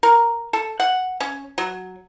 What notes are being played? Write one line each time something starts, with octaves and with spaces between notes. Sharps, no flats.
A#4
A4
F#5
C#4
F#3